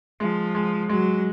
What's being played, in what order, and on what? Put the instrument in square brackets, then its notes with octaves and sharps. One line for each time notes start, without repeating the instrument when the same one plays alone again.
[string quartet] F3 [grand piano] G#3
[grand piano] G#3
[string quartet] F#3 [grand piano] G#3